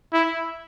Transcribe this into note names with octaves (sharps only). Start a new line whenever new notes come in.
E4